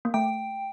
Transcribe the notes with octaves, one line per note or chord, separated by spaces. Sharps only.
A#3
A3 G5